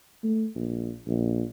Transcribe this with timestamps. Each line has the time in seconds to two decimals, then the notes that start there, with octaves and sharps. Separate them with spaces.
0.23 A3
0.55 A#1
1.08 A#1